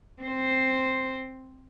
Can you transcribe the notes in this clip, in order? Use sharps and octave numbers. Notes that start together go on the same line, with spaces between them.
C4 C5